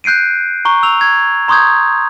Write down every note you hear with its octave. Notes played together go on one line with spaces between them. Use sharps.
F#6 G6 C7 D7 D#7
A#5 C#6 G7
E6 F7
G#6
A#5 C6 C#6 D#6 G6 G#6